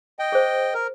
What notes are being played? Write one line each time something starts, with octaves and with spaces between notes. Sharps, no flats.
D#5 G5
G#4 C5
A#4